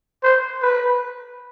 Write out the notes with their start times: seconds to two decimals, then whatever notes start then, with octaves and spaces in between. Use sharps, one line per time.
0.23 C5
0.62 B4